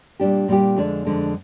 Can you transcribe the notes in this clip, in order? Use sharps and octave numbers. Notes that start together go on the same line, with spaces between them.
A#2 G3 D4 G4
A#2 G3 D4 G4
F2 D3 G#3 D4
F2 D3 G#3 D4